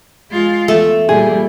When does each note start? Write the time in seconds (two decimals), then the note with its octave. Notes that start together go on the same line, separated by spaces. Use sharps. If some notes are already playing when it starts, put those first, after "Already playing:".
0.31 G#3 F4
0.68 E2 A3
1.09 A#2 G3 G#4